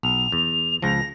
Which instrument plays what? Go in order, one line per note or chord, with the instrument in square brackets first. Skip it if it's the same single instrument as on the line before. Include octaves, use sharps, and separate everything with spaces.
[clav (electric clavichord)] B1 [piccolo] F7
[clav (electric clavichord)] E2
[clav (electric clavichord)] C#2 F3 [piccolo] A#6